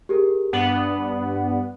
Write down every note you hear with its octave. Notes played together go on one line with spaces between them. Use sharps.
G4 G#4 A#4
G2 B3 D4 F#5 F#7